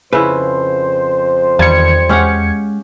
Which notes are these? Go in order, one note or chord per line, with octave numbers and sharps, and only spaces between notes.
F2 C#3 E4 B4 C5
E2 D#3 G3 F5 A5 G#6 C#7
G#3 C#4 G4 F5 F#5